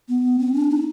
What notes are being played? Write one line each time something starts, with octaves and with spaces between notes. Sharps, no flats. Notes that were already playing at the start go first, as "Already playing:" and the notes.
B3
C4
D4
D#4